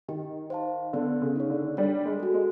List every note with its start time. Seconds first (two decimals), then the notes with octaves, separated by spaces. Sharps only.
0.08 D#3 G4
0.50 C5 F5 A5
0.93 D3 B3
1.22 C#3
1.36 D#4 G#4 C#5
1.50 D3
1.77 G3 D4
2.06 G#3
2.20 F#4 A4
2.34 G#3